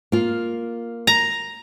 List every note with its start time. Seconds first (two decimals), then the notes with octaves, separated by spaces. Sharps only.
0.12 A#3 F4
1.07 A#5